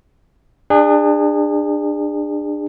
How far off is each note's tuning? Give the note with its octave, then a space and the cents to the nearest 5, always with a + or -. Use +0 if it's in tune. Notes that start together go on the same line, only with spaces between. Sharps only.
D4 +25 G#4 -30